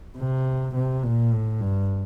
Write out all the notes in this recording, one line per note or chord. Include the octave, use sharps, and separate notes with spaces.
C3
C3
A#2
A2
G2